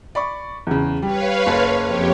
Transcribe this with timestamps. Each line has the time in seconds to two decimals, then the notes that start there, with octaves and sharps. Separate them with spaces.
0.15 D5 B5 C#6
0.67 E2 C#3
1.02 G3 B4 C#5 F5
1.47 F#1 A5
1.82 F2 G4 C#5